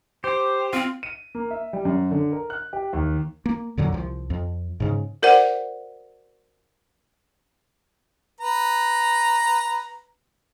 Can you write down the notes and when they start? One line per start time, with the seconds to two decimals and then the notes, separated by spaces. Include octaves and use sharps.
0.24 G4 C5
0.73 C4 F4
1.03 D#7
1.35 A#3
1.51 E5
1.73 G3
1.85 F#2
2.11 D3
2.32 A#4
2.50 F#6
2.73 G4
2.93 D#2
3.46 A#3
3.77 F2 A#2 D3 F#3
3.92 C2 F3
4.30 F2
4.80 G#2 C#3
5.23 F#4 A#4 C5 D5 F#5
8.40 B4 A#5